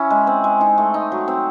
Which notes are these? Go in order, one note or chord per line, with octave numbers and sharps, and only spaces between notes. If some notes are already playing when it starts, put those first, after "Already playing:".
Already playing: C#4 E4
G#3
C4
G#3
D#4
A3
D#4
F#3
C4